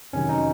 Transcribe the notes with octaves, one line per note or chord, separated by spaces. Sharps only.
F2 C3 D#3 F#3 C#4
D#4